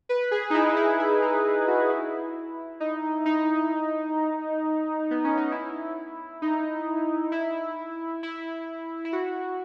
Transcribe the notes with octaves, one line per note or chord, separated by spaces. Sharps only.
B4
G#4
D#4
E4
D#4
E4
E4
D#4
F#4
E4
D#4
D#4
B3
C#4
D#4
E4
D#4
E4
E4
E4
F#4